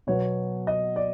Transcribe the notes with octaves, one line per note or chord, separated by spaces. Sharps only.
B2 F#3 B3 C#5
D#5
D5